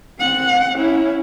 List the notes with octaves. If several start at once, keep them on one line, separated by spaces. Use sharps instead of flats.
C4 F#5
C#4 E4